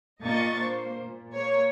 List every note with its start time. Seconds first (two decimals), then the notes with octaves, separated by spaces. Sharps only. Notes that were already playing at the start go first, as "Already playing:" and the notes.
0.23 A#2 A#3 D4 D#5 C#6 A6
0.57 A#3 C5
1.00 A#2
1.35 A#3 C#5